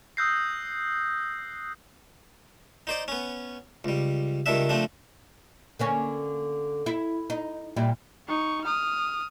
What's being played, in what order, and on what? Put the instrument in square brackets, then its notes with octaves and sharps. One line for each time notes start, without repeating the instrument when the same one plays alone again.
[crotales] D#6 E6 F#6 G6 A#6 C7
[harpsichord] D#4 C5 D5
B3 C#4
C#2 G3
C#2 D#3 G3 D4 E5
F3 A3 C4 D4
[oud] D3 A#3 C#4
E4
D#4
A#2 G3 E4
[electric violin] D#4 C#6
D#6 F6